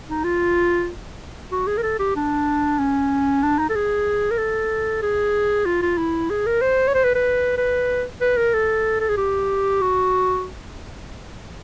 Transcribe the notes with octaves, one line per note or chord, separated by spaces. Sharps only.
D#4
F4
F#4
G#4
A#4
A4
G4
D4
C#4
D4
D#4
A4
G#4
A#4
A4
G#4
F4
F4
E4
G#4
A#4
C5
C#5
C5
B4
B4
B4
B4
A#4
A4
A4
G#4
G4
F#4